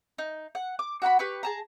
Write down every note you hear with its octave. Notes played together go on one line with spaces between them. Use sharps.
D#4
F#5
D6
F#4 F#5 A#5 B5
G4 B4 C#6
G#4 A5 A#5